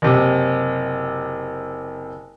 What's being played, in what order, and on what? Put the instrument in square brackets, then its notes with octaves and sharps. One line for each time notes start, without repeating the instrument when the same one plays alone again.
[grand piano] F#1 C3